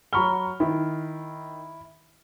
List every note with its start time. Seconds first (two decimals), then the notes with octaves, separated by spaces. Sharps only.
0.13 F#3 A#5 B5 C#6 F6 G7
0.60 D#3 E4